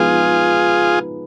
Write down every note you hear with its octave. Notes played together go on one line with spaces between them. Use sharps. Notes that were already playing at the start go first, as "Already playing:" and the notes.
Already playing: F3 G#3 B3 D#4 F4 G#4